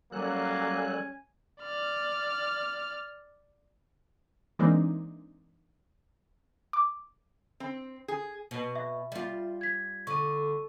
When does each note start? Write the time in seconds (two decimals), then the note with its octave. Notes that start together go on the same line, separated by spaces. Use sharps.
0.12 F#3 G3 A#3 C#4 A4 G#5 F#6
1.61 D5 F6
4.59 E3 G#3 A#3 C4 D4 D#4
6.73 D6
7.60 C4
8.08 G#4
8.51 B2
8.75 E5
9.12 G3 F4
9.61 G#6 B6
10.07 D3 C#6 D#7